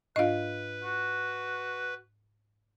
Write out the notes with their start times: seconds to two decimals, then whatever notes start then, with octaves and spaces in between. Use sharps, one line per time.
0.16 G#2 D4 F4 B4 D#5 F5
0.84 F#4